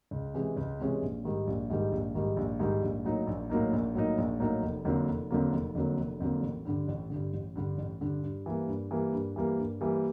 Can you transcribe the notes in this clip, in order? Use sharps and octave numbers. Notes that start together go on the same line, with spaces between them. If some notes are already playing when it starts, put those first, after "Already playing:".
C#2
C3 E3 G#3 C#4
C#2
C3 E3 G#3 C#4
A#1
G#2 D#3 G3
A#1
G#2 D#3 G3
A#1
G#2 D#3 G3
A#1
G#2 D#3 G3
A#1
A2 F#3 A#3 D#4
A#1
A2 F#3 A#3 D#4
A#1
A2 F#3 A#3 D#4
A#1
A2 F#3 A#3 D#4
F1
F2 D3 F#3 A#3
F1
F2 D3 F#3 A#3
F1
F2 D3 F#3 A#3
F1
F2 D3 F#3 A#3
A1
G2 D3
A1
G2 D3
A1
G2 D3
A1
G2 D3
G2
E3 G3 A#3
G2
E3 G3 A#3
G2
E3 G3 A#3
G2
E3 G3 A#3